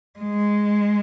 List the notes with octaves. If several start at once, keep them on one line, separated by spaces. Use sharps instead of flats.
G#3